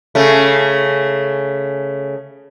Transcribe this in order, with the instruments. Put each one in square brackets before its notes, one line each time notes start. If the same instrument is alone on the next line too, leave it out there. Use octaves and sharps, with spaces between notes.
[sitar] C#3 A3